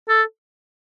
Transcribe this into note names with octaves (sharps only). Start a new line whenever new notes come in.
A4